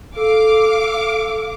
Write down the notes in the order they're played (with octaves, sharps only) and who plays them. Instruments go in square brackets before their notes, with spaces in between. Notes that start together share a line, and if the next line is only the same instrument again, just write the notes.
[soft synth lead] A4 [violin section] F5 D6